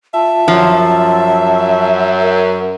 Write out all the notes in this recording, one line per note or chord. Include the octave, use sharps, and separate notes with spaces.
F4 E5 A5
F#2 F3
A#4